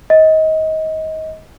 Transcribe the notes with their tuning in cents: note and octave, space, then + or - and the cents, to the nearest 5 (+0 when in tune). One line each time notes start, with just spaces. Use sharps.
D#5 +25